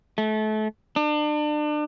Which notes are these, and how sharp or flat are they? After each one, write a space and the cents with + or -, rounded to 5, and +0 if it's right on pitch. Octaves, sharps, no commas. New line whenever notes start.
A3 -30
D4 +35